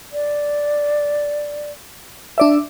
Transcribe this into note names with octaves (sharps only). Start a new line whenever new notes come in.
D5
D4 D5 E5